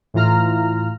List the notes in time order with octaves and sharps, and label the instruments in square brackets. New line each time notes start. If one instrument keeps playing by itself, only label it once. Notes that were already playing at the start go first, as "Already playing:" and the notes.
[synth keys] A2 E3 F4 A#5 F6